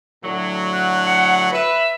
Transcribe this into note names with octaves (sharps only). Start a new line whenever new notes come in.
A2 D3 F#3
F#6
F#5
B4 E5